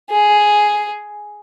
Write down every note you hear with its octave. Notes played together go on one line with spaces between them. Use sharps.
G#4